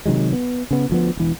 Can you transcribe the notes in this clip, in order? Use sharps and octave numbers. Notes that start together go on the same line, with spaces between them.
C3 D#3 F#3 G#3
B3
C#3 B3
D2 F3 B3
E1 E3